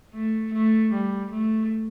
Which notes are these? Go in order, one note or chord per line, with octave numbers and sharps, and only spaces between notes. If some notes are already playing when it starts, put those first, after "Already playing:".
A3
A3
G3
A3